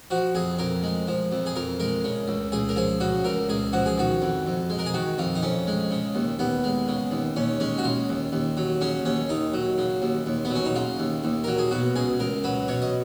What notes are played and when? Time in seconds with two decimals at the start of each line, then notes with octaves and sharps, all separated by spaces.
0.11 F3 F#4
0.35 F2 G#4
0.59 F2 A#4
0.83 G#3
1.07 F3
1.32 F2
1.46 G#4
1.56 F2 A#4
1.80 G#3 A#4
2.04 C#3
2.28 C#2
2.52 C#2 G#4
2.69 A#4
2.76 F3 G#4
3.00 C#3 F#4
3.24 C#2 A#4
3.49 C#2 G#4
3.73 F3 F#4
3.86 G#4
3.98 D#3 F#4
4.22 F2
4.46 F2
4.70 G#3
4.79 A#4
4.86 G#4
4.94 D#3 F#4
5.18 F2 F4
5.35 D#4
5.43 F2 C#4
5.67 G#3
5.91 C#3
6.15 D#2
6.39 D#2 B3
6.64 G#3
6.88 C#3
7.11 D#2
7.36 D#2 C#4
7.60 G#3 C#4
7.78 F#4
7.84 C#3 F4
8.09 D#2
8.32 D#2
8.57 F#3
8.81 C#3 C#4
9.05 D#2 C#4
9.29 D#2 D#4
9.54 F#3
9.78 C#3
10.02 D#2
10.26 D#2
10.45 B3
10.50 F#3
10.55 C#4
10.65 D#4
10.75 C#3 F4
10.99 D#2
11.24 D#2
11.44 F#3 A#4
11.58 G#4
11.71 B2 F#4
11.96 C#2 G#4
12.19 C#2 A#4
12.44 F#3 B4
12.68 B2 C#5
12.82 D#5